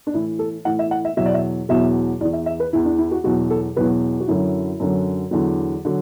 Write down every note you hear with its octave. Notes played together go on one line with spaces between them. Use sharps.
D4
A2 E3 E4
A4
A2 E3 F#5
E5
F#5
E5
E2 B2 F#3 E5
D5
E5
E2 B2 F#3 E5
E2 E3 D5
E5
E5
B4
E2 E3 E4
D4
E4
F#4
E2 B2 F#3 F#4
A4
E2 B2 F#3 B4
F#4
F#2 D3 F#3 E4
F#2 D3 F#3
E2 D3 F#3
D3 F#3